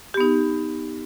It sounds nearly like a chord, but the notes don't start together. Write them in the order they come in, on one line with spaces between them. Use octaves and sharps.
G4 B3 D#4